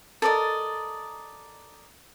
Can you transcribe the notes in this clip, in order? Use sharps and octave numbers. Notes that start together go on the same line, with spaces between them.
A4 A#4 D5 D#5